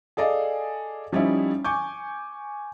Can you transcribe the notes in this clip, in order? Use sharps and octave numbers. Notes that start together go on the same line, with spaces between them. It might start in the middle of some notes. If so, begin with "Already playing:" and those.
G#4 A4 D5 D#5 F5
F3 G3 C#4 D#4 E4
G#5 C#6 D6 G6